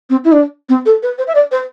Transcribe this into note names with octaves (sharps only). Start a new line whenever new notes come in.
C4
E4
D4
C4
A4
B4
C5
E5
D5
C5